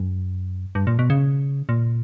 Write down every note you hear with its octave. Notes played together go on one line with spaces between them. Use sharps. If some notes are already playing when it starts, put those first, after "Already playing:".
Already playing: F#2
G2
A#2
B2
C#3
A#2